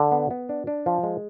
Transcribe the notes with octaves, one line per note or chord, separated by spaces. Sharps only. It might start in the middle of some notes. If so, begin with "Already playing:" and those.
Already playing: D3
B3
B3
D4
D4
F3
G#3